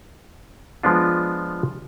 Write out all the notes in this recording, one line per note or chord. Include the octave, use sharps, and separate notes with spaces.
F3 G#3 B3 D4 F4